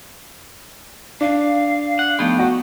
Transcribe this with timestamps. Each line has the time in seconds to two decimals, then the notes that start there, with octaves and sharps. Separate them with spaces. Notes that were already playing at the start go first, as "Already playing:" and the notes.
1.21 D4 F5
1.99 F#5
2.19 F3 A3 B3 D#4 G4
2.39 F#4 F#5